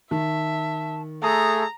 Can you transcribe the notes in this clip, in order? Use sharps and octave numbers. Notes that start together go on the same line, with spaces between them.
D#3 E5 A5
A3 G#4 A4 A#5 D#6